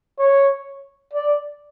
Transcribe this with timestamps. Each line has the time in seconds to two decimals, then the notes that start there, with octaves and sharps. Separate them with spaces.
0.19 C#5
1.13 D5